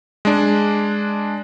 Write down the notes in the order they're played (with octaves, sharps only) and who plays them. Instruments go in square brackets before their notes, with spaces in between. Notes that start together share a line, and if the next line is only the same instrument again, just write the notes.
[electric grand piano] G#3 D4